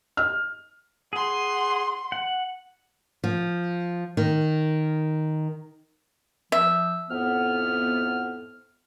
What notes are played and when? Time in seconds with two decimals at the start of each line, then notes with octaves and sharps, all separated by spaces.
0.17 F6
1.13 G#4 F#5 C6
2.12 F#5
3.24 F3
4.17 D#3
6.52 F3 E5
7.10 F2 A2 B3 F6